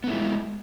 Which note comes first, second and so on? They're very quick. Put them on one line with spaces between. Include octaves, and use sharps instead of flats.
B3 A3 E4 G#3